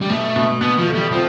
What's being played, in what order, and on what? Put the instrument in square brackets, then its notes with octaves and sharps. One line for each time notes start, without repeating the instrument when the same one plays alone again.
[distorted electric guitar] G3
[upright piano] B2 [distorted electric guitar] A3
[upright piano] B2
[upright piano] B2 [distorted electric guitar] B3
[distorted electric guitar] F3
[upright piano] A3
[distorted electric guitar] G3
[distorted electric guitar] F3 [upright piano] C4